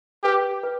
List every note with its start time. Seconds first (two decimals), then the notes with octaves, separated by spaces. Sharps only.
0.23 G4 B4
0.63 B4